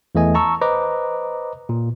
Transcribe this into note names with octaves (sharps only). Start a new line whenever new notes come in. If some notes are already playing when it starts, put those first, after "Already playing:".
E2 E3 A3 D#5 G#5
A5 A#5 C#6 E6
B4 C5 D#5 A#5 D6
A#2